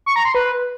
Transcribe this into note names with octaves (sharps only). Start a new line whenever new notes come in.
C#6
A#5
C6
B4